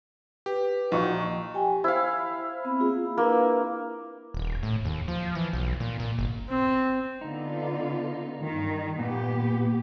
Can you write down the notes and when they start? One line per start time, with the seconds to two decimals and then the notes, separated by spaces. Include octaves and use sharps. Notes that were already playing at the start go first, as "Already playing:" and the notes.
0.46 G4 B4
0.92 A#1 F3 D#4 F#4 C#6
1.54 G4 G5 G#5
1.84 E4 C5 F5
2.65 B3 C4 B5
2.80 A#3 F4 G#4
3.17 A#3 D4 E4 B4
4.34 D#1
4.63 A2
4.85 D#2
5.08 F3
5.35 E3
5.53 B1
5.80 A#2
6.00 A#2
6.18 G1
6.49 C4
7.21 D3 B3 D#4 F4
8.42 G2 D#3
8.99 A#2 B3 G4